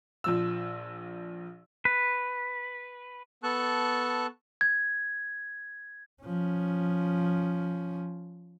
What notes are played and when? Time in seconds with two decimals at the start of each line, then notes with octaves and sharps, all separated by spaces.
0.24 A#1 F3 E6
1.85 B4
3.43 B3 A4 A5 C#6 F#6
4.61 G#6
6.23 F3 C#4